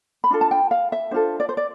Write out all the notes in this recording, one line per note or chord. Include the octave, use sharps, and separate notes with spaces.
B5
D4 F4 A4
A5
G5
F5
E5
D4 F4 A4 C5
D5
C5
D5